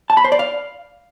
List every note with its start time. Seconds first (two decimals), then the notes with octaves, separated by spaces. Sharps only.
0.10 A5
0.17 B5
0.24 C5
0.32 D5
0.39 F5